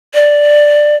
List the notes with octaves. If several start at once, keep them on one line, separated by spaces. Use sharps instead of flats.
D5